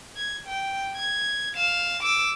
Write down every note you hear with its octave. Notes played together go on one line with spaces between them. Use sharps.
G#6
G5
G#6
F5 E7
D6 E6